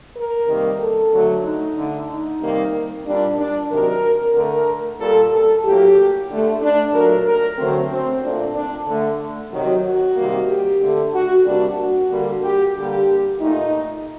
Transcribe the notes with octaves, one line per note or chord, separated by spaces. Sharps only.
A#4
C3 D#3 G3 A#3
A4
D3 F#3 A3
D#4
D3 A3
D#4
C3 D#3 G3 A#3
A#2 G3 A#3 D4
D4
C3 D#3 F#3 A#4
D3 A3 A#4
A#2 G3 A#3 A4
A4
A2 F#3 A#3 G4
D3 A3
D4
A#2 F#3 A3 A#4
A#4
D3 F#3 A3 C4
C4
A#2 A3 D4
D4
D3 A3
C3 D#3 F#3
F#4
C3 D#3 G3 A#3
G4
D3 A3
F#4
C3 G3 A#3 D4
F#4
D3 G3 A#3
G4
D3 G3 A#3 G4
A#2 A3 D#4